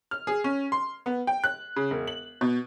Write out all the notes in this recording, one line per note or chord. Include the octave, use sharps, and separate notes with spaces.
F6
G#4
C#4
C6
B3
G5
F#6
C#3
E1
F#7
B2